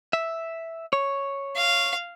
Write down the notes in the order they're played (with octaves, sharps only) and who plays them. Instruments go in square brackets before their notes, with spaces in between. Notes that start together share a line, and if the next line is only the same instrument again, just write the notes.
[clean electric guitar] E5
C#5
[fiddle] F5